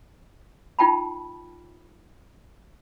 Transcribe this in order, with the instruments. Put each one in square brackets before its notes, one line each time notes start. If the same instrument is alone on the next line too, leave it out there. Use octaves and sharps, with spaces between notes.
[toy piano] D#4 F4 G5 A5 B5